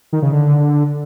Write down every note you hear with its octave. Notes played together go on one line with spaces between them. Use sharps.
D#3
C#3
D3